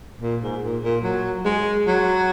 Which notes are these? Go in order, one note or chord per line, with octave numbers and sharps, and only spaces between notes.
A#2
G#2
A#2
A#2
F#3
G#3
F#3